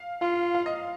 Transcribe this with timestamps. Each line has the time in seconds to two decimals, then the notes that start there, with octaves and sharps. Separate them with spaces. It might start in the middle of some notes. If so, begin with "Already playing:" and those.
Already playing: F5
0.21 F4 F5
0.55 F5
0.66 D#5